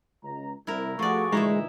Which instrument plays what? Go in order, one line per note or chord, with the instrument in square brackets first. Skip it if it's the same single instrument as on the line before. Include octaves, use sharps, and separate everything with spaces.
[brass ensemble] C#2 A#5
[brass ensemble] C2 [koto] E4 A#4
[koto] F3 D5 [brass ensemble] A3 A4 F#5 [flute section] F#4 G#4 C#6
[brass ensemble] D2 A#2 E3 [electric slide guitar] G#3 [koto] D#4 E4 E5